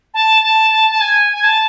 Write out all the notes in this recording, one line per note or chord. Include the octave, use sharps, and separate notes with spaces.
A5
A5
A5
A5
G#5
G#5
A5